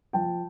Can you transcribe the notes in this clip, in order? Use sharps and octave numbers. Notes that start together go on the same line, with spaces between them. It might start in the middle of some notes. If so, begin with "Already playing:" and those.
F3 G5 A5